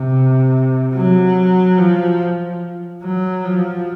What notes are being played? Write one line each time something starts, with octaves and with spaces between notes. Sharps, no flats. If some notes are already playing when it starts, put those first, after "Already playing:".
Already playing: C3
F#3
F3
F#3
F3